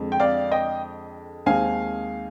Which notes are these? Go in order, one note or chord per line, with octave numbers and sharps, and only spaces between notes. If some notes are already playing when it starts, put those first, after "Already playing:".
Already playing: F2 D3 G#3 C4
G5
D5 F5
D#5 G5
D#2 D#3 G#3 C4 F5 G#5